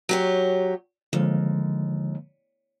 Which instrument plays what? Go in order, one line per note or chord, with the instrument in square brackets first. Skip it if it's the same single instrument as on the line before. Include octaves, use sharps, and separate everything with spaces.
[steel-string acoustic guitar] F#3 G4 C#5
[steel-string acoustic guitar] D#2 [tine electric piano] D3 F3 G#3